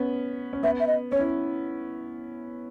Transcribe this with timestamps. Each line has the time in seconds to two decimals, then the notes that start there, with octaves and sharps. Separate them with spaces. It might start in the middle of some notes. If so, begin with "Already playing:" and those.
Already playing: B3 C#4
0.53 C#4
0.63 B3 E5
0.80 E5
0.87 D#5
1.12 C#4 C#5
1.19 E4